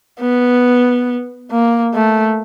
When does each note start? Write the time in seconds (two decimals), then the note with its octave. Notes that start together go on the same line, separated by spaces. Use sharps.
0.21 B3
1.51 A#3
1.94 A3